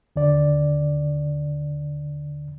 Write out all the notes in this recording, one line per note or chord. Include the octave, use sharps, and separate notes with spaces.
D#2 D3 D5